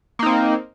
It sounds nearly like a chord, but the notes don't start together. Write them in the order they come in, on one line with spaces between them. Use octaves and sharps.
A#3 D#4 C4